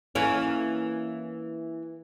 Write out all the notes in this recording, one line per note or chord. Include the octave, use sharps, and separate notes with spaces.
E3 A#3 C#4